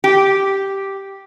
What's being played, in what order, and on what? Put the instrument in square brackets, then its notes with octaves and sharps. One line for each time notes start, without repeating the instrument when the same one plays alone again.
[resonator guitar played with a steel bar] G4